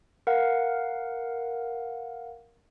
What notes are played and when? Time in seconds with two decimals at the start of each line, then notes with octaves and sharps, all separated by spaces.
0.27 A#4 F5 F#5